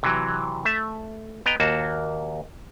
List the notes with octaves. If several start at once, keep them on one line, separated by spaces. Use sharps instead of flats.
C3 E3 F#3
A3 E5 A5
B3 D#5 G5 A#5
D#2 A#3 F#4 A5